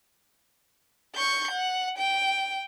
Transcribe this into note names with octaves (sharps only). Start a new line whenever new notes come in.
C#6 G6
F#5
G5